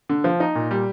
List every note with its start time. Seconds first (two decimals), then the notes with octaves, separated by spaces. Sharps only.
0.09 D3
0.24 F3
0.40 D#4
0.55 A#2
0.71 G3